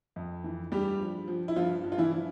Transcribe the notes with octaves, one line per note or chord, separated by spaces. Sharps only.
F2
E3
G2 G3 G4
F3
F3
E4
G2 F3 F4
G2
F4
E3 E4
F3